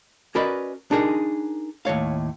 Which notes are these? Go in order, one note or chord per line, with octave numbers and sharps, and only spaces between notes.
C#4 F#4 A#4 B4 D5 D#5
D4 D#4 G#4 A#4
D#2 A2 C#5 F5